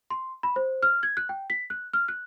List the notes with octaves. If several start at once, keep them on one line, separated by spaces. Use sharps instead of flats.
C6
B5
C5
F6
G#6
F#6
G5
B6
F#6
F6
F#6